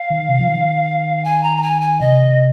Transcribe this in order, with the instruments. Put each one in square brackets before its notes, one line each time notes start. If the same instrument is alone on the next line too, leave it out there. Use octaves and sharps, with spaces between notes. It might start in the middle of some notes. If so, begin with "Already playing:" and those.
Already playing: [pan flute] F5
[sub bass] D#3
C3
F3
D#3
[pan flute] G#5
A#5
A#5
G#5
G#5
[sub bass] C3 [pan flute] D#5